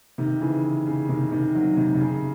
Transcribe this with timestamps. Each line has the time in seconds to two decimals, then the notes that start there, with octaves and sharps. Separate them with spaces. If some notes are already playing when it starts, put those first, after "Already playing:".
0.18 C3 D#3
0.41 C#3 E3
0.87 C#3
1.09 C3 D#3
1.32 C3 D#3
1.55 D#3 F#3
1.77 C3 D#3
1.94 C3
2.00 C#3